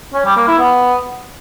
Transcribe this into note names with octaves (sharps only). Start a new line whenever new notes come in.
C#4
G3
A#3
E4
B3